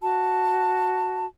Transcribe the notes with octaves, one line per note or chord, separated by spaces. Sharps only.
F#4 A5